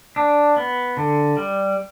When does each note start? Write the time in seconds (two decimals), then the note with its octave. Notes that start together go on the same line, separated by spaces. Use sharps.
0.16 D4
0.56 B3
0.97 D3
1.37 G3